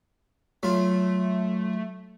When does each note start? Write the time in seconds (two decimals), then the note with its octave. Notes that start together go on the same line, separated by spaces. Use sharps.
0.63 F#3 A3 F4